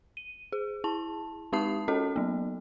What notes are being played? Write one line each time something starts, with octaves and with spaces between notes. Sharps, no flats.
D#7
G#4
E4 A5
G#3 D#4 G4 A5 D#6 C7
C#4 F#4 A4 D#5
F#3 B3